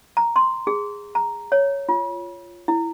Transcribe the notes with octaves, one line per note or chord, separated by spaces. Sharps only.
A#5
C6
G#4
A#5
C#5
F4
E4